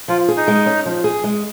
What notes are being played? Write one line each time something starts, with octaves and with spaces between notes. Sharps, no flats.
F3 F4
G#4
D#4
G#3
C#4
F3
G#4
G#3